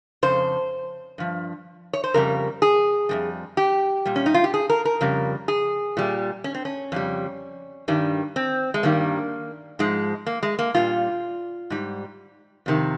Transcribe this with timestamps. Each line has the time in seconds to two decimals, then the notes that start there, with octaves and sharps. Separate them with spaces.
0.23 F2 C#3 C5
1.18 G2 F3
1.93 C#5
2.04 C5
2.14 F2 C#3 G3 A#4
2.62 G#4
3.09 F2 C3 G3
3.57 G4
4.05 A#2 G3
4.16 C#4
4.26 D#4
4.34 F4
4.44 G4
4.54 G#4
4.70 A#4
4.85 A#4
5.01 F2 C#3 G3
5.48 G#4
5.97 A#2 G3
6.44 C#4
6.55 C4
6.65 C#4
6.92 F2 C#3 G3
7.88 G2 D#3 G3
8.36 C4
8.74 G#3
8.83 G2 D#3 G3 A#3
9.79 G#2 F3 G#3
10.26 A#3
10.43 G#3
10.59 A#3
10.74 A#2 G3 F4
11.70 G#2 G3
12.66 F2 C3 D#3